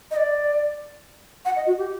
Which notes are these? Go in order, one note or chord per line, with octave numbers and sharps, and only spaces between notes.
D#5
D5
F#5
D#5
F#4
G4